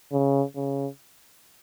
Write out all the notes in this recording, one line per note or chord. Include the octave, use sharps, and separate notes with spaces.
C#3
C#3